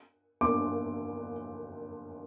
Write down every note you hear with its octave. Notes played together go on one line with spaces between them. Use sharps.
D6